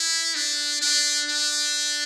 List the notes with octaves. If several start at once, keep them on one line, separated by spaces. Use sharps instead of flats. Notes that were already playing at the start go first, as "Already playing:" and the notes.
Already playing: E4
D4
D4
D4